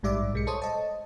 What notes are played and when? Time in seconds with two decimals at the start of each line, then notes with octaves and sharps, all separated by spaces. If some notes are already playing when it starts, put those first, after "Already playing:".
0.03 A#1 G#2 G3 D5 E5 D6
0.33 B1 G#3 C#7
0.47 A4 C5 C#5 D#6
0.62 D#5 A5